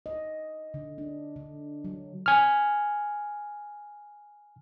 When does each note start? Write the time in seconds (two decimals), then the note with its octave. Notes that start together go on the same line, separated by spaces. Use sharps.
0.06 D#5
0.74 D3
0.98 D4
1.36 D3
1.85 F#3
2.26 G#5 F6